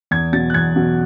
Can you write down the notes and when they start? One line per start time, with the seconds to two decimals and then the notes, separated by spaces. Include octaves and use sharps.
0.11 E2 G#6
0.32 B2 F#3 A6
0.50 F#6
0.54 E2 G#6
0.76 B2 F#3